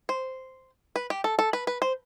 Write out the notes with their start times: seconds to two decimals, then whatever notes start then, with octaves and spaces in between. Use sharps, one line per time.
0.09 C5
0.96 B4
1.10 G4
1.24 A4
1.39 A4
1.53 B4
1.67 B4
1.82 C5